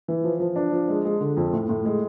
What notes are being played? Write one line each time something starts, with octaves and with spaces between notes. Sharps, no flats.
E3
F3
F3
D4
F3
G#3
G#3
D3
F2
A2
A2
G#3